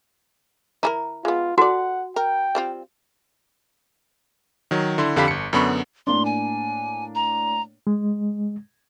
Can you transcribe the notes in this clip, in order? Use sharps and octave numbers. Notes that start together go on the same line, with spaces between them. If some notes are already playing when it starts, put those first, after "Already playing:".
E4 G#4 A#4 A#5
G#3 B3 F4
F#4 A4 D5 F#5
A#4 G5
G3 C4 F4
D#3 F#3
D3 E4 C6
F2 D3 G4 F5 B5 B6
G1 C#7
F#2 D3 B3 B5 C#6
A2 A#3 D4 C6
G#5
A#5
G#3